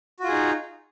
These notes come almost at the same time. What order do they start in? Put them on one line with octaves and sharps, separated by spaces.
F#4 F4 G#4 D#4